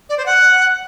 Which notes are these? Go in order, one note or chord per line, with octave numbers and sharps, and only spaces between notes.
D5
C5
F#5